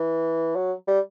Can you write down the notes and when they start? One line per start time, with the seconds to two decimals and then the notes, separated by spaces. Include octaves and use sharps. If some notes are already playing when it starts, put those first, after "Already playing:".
Already playing: E3
0.56 F#3
0.88 G3